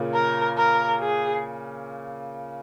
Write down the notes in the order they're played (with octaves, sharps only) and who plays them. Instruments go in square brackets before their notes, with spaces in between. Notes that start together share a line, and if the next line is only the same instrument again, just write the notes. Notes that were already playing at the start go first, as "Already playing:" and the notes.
Already playing: [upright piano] A#2 C#3
[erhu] A#4
A#4
G#4